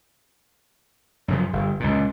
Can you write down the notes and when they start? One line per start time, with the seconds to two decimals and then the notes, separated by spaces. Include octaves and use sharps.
1.28 F#2 C#3 F3
1.53 G1
1.80 C#2 A#2